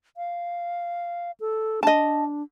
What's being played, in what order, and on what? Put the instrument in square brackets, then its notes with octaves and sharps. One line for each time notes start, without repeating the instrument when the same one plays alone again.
[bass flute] F5
A4
[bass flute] D4 [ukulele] D#5 A5